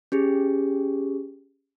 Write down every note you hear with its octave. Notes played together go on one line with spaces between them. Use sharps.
C#4 G4 G#4